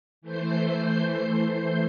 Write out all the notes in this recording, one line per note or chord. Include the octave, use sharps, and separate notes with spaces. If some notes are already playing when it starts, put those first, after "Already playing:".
E3 A3 C5 G6 C7